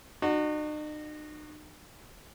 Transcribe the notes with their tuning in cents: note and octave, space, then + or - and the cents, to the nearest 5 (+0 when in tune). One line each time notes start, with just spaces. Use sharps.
D#4 -45 F#4 +0